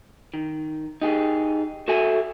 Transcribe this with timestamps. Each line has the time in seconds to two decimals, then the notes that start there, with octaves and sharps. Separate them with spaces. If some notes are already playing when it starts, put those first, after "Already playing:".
0.34 D#3
1.02 D#4 G4 G#4
1.88 F#4 A4 E5 G#5